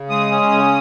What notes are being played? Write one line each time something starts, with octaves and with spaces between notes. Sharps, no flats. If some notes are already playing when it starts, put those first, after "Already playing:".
Already playing: C#3
G#3 D#6
C#4
C#3